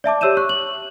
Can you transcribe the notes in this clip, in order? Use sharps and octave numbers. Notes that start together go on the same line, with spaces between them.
D5 E5 A5 D6
G4 C#5 E6 G6 D#7 E7
C#6 F#6
F#7